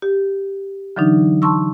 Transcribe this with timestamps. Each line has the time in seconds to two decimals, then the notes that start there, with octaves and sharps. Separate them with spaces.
0.02 G4
0.96 D3 E3 F#3 D4 D#4
1.42 A5 C6 C#6 E6